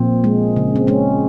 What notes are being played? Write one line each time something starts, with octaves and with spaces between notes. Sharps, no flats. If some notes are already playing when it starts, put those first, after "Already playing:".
Already playing: A#2 F3 C4
G#3
C#3
C4
G#3 C#4